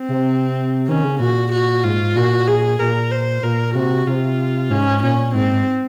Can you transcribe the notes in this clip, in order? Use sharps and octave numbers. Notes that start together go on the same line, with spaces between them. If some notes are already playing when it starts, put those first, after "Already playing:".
Already playing: C4
C3
D#3 C#4
C#3
A#2 F#4
F#4
G#2 F4
A#2 F#4
G#4
A#2 A#4
C5
A#2 A#4
C3 F#4
C3 F4
G#2 C#4
A#2 C#4
G#2 C4